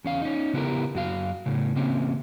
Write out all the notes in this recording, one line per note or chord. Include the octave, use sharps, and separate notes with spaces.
E2 C#4 F5
C#4 D#4
C#3 B3 E4 G4 A#4
F#2 F#4 F5
A2 C#3
C#3 A#3 C4 C#4